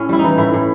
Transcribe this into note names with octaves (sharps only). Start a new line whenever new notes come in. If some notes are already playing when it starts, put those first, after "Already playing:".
Already playing: A2 C#4
G3 E4
E3 D#4
A2 E4
A2